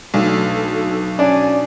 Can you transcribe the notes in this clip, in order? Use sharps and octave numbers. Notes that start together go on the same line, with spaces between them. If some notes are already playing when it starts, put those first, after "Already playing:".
B1 A3 D4 A4
C#4 D4 G#5